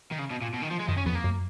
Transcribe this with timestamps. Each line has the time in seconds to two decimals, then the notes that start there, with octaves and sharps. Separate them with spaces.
0.11 D#3
0.19 C#3
0.30 B2
0.41 A#2
0.54 B2
0.62 D#3
0.71 F3
0.80 G#3
0.88 F#2 D#3
0.97 C#4
1.06 F2 B3
1.15 A#3
1.24 F#2